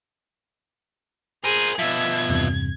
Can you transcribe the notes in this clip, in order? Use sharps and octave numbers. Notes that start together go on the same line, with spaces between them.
G#4 A#4 C5 D#7
B2 F3 E5 G#6 B6
E2 G2 C3